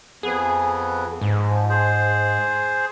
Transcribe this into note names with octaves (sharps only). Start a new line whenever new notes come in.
F2 B3 G#4
G#2
F3
G#4 C5